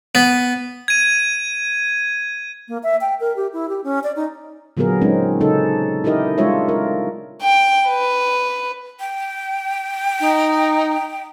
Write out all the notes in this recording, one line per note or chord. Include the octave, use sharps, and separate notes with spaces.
B3
G#6 D#7
A#3
E5
G5
A#4
G4
E4
G4
C#4
D5
D#4
A#2 D3 F#3 B3 G#4 A#4
G#3 C4 C#4 D#4
C#3 C#4 D#4 A4
D#4 E4 G4 A#4 D#5
G3 G#3 D4 F4 C#5 E5
A#4
G5
B4
G5
D#4